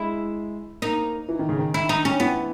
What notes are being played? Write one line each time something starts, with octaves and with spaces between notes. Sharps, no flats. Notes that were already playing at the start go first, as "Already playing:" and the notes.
Already playing: G#3 E4
A#3 D#4
E3
D#3
C#3
D#3
E4
D#4
C#4
E3 B3